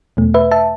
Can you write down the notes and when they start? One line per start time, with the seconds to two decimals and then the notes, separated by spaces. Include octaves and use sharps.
0.17 E2 B2 A3
0.34 B4 E5
0.51 E5 A5